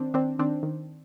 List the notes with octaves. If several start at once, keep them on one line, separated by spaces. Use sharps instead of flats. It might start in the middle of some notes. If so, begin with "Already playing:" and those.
Already playing: D#3 C4 D4
D#3 C4 D4
D#3 C4 D4
D#3